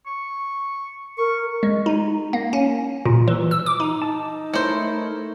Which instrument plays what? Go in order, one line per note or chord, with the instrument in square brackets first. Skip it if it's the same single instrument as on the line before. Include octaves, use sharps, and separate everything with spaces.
[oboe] C#6
[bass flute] A#4 [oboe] C#6
[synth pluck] G#3
D#4
A#3
C#4
A#2
E3
E6
D6
D#4
[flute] D#4 [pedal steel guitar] A5
[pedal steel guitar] A3 A#4 C#5 [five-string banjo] E4 C5